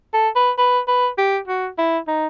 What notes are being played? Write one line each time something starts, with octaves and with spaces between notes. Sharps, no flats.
A4
B4
B4
B4
G4
F#4
E4
D#4